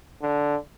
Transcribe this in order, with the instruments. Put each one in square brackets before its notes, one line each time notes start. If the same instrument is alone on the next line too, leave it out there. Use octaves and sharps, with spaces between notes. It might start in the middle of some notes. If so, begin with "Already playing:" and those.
[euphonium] D3